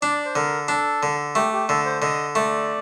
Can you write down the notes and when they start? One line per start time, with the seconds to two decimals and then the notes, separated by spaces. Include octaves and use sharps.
0.02 D4 D5
0.25 C5
0.35 D3 A#4
0.68 D4 A4
1.03 D3
1.35 A3 G4
1.53 G4
1.68 D3 A4
1.85 C5
2.02 D3 D#5
2.35 A3 D5